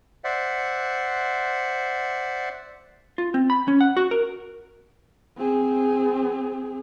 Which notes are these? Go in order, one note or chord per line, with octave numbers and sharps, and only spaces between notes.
C5 D5 E5 F#5
F4
C4
B5
C#4
F#5
F#4
A#4
C4 G#4